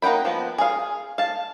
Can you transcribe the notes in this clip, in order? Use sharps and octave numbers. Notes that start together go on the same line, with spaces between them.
A#3 D#4 F#5 G5 B5
F3 B3
G#4 F5
F5 A5